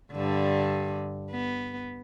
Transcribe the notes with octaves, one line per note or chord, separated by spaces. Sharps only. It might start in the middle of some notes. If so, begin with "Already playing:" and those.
G2 D3
B3